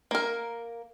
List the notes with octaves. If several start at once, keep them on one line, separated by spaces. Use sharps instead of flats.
A#3 A#4